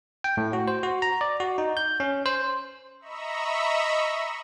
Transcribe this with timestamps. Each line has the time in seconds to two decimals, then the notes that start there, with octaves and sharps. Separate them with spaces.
0.24 G5
0.37 A2
0.53 F#4
0.68 C5
0.83 F#4
1.02 A#5
1.21 D5
1.40 F#4
1.58 D#4
1.77 G6
2.00 C#4
2.26 C5
3.00 D#5 E5 A#5 B5 C#6 E6